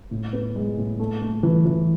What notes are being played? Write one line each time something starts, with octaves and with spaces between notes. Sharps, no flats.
A2
B3
G#3
A2
A3
A3
E3
E3